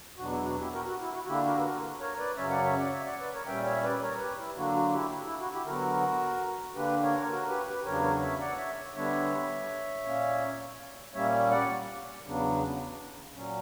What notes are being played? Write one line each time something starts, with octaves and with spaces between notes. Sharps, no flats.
E2 B2 F#3 B3 D4 F#4
E4
F#4
E4 G4
F#4 A#4
F#4
E4
F#4
F#4
D3 A#3 D4 E4 G4
F#4 A#4
B4
F#4 A#4
A#4 C#5
B4 D5
F#2 C#3 F#3 C#4 C#5 E5
D5 F#5
C#5 E5
D5 F#5
C#5 E5
D5 F#5
B4 D5
A#4 C#5
A#2 G3 C#4 E5 G5
C#5 E5
B4 D5
D5
A#4 C#5
G4 B4
E4
D3 F#3 A#3 D4 F#4
F#4
E4 G4
E4
F#4
E4 G4
D3 F#3 B3 F#4 A#4
D3 A#3 D4 G4 B4
A#4 C#5
F#4 A#4
G4 B4
G4 B4
E2 C#3 F#3 B3 D4 A#4 C#5
A#4 C#5
C#5 E5
D5 F#5
C#5 E5
D3 G3 B3 D4 C#5 E5
A#2 A#3 C#4
A#2 G3 A#3 C#4 C#5 E5
D5 F#5
E2 C#3 F#3 B3 D4
A#2 F#3 C#4